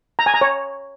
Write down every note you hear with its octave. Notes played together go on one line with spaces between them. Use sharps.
A#5
G#5
A#5
C#5